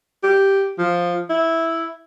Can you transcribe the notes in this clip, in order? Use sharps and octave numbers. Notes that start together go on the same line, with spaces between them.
G4
F3
E4